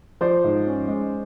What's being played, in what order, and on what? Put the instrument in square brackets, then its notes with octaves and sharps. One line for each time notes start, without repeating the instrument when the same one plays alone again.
[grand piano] F3 C5 D5
G#2
C#4
G#3